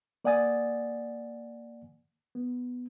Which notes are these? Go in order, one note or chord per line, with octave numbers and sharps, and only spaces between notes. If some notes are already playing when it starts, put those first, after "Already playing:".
A#3 D5 F#5 G#5 D#6 A6
B3